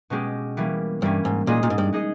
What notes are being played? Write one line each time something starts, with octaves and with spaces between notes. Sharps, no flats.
B2 G#3 C#4 G4
E3 G3 A#3 C#4
G2 E3 G3 A#3 C#4
G#2
A#2 G#3 D#4 G#4 D#5
A#2
G#2
G2
G#3 D#4 G#4 D#5